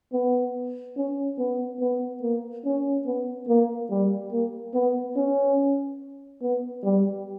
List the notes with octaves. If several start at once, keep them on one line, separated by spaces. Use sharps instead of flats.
B3
C#4
B3
B3
A#3
C#4
B3
A#3
G3
A#3
B3
C#4
B3
G3